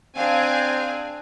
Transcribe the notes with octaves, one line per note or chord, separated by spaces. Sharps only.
C4 D4 G#4 F5 G#5